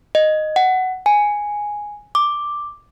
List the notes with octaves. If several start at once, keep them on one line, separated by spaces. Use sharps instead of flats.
D#5
F#5
G#5
D6